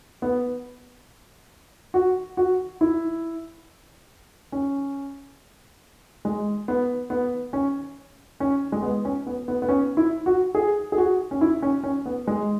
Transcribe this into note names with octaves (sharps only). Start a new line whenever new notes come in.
B3
F#4
F#4
E4
C#4
G#3
B3
B3
C#4
C#4
G#3
B3
C#4
B3
B3
B3
C#4
E4
F#4
G#4
G#4
F#4
C#4
E4
C#4
C#4
B3
G#3